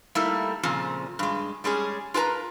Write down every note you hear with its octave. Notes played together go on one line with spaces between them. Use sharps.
G3 A3 A#3 D#4 E4
A#2 C#3 F3 C4
G2 G#3
G3 G#3 C#4 G#4
F4 A#4 B4 A5 A#5